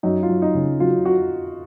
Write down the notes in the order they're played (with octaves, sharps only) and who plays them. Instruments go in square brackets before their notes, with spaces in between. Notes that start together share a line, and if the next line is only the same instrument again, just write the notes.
[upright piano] F#2 [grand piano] D#4
[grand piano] F4
[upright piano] F#2
[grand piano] D#4
[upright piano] C#3
[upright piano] F#3 [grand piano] F4
[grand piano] F#4